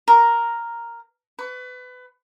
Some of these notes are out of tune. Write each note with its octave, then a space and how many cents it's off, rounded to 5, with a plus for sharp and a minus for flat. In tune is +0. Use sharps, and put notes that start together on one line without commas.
A#4 +0 A#5 +5
B4 +25 C#6 +25